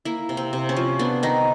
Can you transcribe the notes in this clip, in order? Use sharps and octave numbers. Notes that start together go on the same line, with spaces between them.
A#3 E4
C3
C4
C3
C#4
F3
B3 D4
D#3 D#4